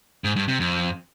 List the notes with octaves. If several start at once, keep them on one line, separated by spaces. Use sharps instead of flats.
G#2
G2
C3
F2